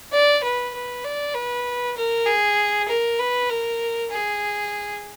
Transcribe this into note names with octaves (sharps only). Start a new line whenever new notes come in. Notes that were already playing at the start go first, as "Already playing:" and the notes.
D5
B4
B4
D5
B4
A#4
G#4
A#4
B4
A#4
G#4